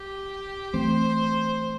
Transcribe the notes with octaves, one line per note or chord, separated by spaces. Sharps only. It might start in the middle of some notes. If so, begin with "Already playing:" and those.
Already playing: G4
E3 A3 C4 C5